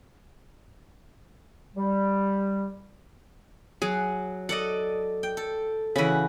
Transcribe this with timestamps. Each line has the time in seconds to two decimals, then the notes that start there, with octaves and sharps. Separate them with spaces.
1.76 G3
3.82 F#3 G#4
4.49 A4 D5 D#5 F#5
5.23 G5
5.37 A4
5.96 C#3 E3 F#4 B5